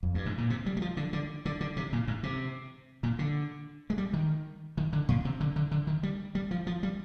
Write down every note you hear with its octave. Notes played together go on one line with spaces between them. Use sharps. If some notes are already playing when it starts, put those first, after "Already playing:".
F2
G2
G#2
A#2
C3
G3
G3
F3
D3
D3
D3
D3
C3
A#2
G#2
C3
A#2
D3
G#3
G3
D#3
D#3
D3
A#2
C3
D3
D3
D3
D#3
G3
G3
F3
F3
G3